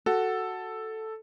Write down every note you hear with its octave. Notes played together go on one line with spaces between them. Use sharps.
F#4 A4